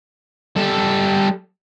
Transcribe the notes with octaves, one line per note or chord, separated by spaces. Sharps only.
G3 A4